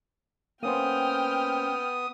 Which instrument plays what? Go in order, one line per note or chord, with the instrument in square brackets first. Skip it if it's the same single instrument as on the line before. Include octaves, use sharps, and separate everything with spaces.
[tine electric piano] A#3 C#4 C5 [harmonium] B3 [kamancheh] G5 F6 [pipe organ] D#6